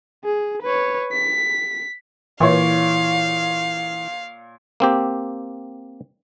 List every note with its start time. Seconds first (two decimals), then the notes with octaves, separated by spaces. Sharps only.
0.25 G#4
0.62 B4 C#5
1.12 B6
2.40 A#2 E3 C#5 F5
4.80 A#3 C4 G4